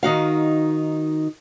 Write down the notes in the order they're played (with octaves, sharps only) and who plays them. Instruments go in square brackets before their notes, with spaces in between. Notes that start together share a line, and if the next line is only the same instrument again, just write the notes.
[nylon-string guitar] D#3 D#4 F#4 F5